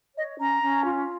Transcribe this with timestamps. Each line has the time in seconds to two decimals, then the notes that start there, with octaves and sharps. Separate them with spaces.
0.16 C#5 D#5
0.39 C#4 A#5
0.63 C#4
0.85 F4